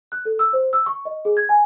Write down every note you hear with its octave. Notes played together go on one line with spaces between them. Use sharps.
F#6
A4
E6
C5
E6
C#6
D#5
G#4
G#6
G#5